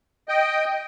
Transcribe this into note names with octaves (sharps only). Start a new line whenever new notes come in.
D#5 G5